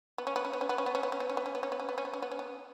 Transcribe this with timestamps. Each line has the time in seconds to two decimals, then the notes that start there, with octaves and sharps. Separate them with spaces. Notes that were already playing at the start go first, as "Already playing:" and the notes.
0.18 B3
0.27 C#4
0.36 B3
0.45 C#4
0.53 B3
0.61 C#4
0.69 B3
0.78 C#4
0.86 B3
0.95 C#4
1.03 B3
1.12 C#4
1.20 B3
1.29 C#4
1.37 B3
1.46 C#4
1.55 B3
1.63 C#4
1.72 B3
1.80 C#4
1.89 B3
1.98 C#4
2.05 B3
2.13 C#4
2.22 B3
2.31 C#4
2.39 B3